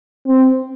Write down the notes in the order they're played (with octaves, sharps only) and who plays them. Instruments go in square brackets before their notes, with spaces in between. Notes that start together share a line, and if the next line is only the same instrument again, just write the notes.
[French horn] C4